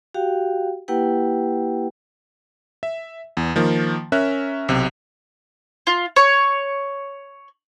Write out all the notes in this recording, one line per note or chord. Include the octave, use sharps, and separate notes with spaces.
F#4 G4 F5 G5
A#3 E4 G4 B4 F#5 G5
E5
E2
D#3 F3 A#3
C#4 A#4 E5 F#6
B1 C3
F4
C#5